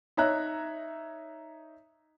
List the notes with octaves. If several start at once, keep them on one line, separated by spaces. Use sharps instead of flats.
D#4 C#5 E5 A#5 F#6